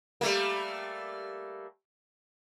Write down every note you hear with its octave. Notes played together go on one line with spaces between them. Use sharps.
G3 A3 A#3